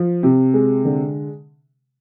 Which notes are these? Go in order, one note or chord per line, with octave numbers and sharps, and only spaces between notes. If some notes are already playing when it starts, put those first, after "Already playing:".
Already playing: F3
C3
G#3
D3